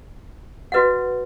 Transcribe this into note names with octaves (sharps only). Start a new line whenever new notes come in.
F#4 B4 D#5 F#5